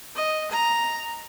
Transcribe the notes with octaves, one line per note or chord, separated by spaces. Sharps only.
D#5
A#5